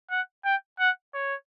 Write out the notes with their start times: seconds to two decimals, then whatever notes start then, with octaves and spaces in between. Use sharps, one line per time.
0.11 F#5
0.45 G5
0.80 F#5
1.14 C#5